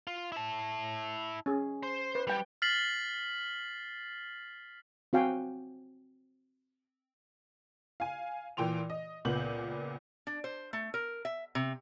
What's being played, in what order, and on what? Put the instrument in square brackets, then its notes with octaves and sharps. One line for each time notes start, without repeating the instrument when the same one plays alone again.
[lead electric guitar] F4
E4 A5
[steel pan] C#4 G#4
[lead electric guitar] C5
[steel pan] B4
[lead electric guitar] G3 [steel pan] B4 G5
[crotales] F6 A6 B6 C7 F#7
[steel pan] C4 F#4 F5 G5 G#5
[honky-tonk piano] F5 G#5
A#2 E3 G5 C6 F7
D#5
C#2 A#2 B3 G6 F#7
[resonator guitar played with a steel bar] D4
C5
A3
A#4
E5
C3